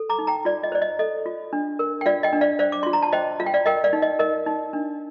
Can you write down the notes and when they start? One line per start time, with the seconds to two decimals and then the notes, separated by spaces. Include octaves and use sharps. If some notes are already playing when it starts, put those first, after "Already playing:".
Already playing: A4
0.10 A#5 D6
0.19 D#4
0.27 G5 A#5
0.45 F4 D5
0.63 D#5
0.72 C5 D5
0.82 D#5
0.99 A4 D#5
1.26 F4
1.53 D4
1.79 A#4
2.01 G5
2.06 F4 D5 F5
2.23 D#5 G5
2.33 D4
2.41 D5 F5
2.59 C5 D5 F5
2.72 D6
2.83 F4 C6
2.93 A#5
3.02 A5
3.13 C5 D#5 G5
3.40 F4 F5
3.46 G5
3.54 D5 F5
3.66 A#4 D#5 G5
3.84 D5 F5
3.93 D#4
4.02 D#5
4.19 A#4 D#5
4.46 D#4
4.73 D4